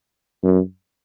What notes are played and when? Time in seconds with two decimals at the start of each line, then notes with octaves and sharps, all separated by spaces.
0.44 F#2